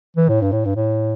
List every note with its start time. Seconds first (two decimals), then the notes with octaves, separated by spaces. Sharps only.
0.17 E3
0.29 A2
0.41 G2
0.52 A2
0.65 G2
0.76 A2